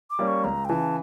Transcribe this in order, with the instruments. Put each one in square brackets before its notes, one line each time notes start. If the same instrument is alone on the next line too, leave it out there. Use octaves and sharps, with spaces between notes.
[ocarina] D6
[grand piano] G3 A#3 C#4
[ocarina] C#6
[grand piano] C#2 [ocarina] A#5
[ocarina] G5
[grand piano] C#3 E3 [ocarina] A5